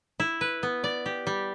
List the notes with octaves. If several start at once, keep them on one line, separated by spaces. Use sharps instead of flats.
E4
B4
B3
D5
G4
G3